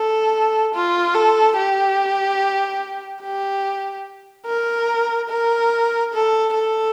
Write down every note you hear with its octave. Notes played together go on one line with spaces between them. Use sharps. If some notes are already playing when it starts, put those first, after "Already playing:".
Already playing: A4
F4
A4
G4
G4
A#4
A#4
A4
A4